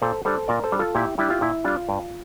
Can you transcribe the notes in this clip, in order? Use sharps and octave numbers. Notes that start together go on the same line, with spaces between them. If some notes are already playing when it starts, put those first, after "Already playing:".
A#2 A4 C5
G3 D4 A4 C5
A#2 A#4 D5
A4 C5
G3 D4
F4 A4
A#2 E4 G4
G3 D4 E4 G4
F4
A#2 E4
G3 D4 F4
G2